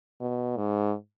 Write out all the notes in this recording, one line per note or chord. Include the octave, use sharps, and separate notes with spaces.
B2
G#2